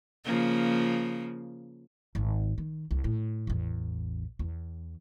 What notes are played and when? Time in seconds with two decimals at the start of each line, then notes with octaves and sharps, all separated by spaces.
0.25 C#3 F3 A#3
2.15 G#1
2.58 D#3
2.91 C2
3.04 A2
3.47 A1 E2
4.39 E2